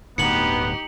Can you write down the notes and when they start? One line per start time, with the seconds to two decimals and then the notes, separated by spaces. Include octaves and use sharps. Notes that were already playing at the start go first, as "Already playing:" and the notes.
0.18 D1 D2 G2 B3 D#4 G4 C#7 F#7